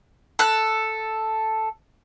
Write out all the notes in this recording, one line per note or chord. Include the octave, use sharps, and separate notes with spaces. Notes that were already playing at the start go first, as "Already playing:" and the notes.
A4 F#6